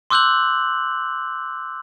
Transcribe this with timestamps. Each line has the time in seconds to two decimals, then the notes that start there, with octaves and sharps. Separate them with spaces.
0.10 C6 D6 E6 F#6 G6 F#7